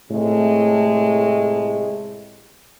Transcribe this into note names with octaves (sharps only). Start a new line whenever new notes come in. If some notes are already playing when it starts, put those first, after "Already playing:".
A2 C3 G#3 A3